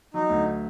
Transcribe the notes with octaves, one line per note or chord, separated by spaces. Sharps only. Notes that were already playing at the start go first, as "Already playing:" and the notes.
F#3 D#4
D2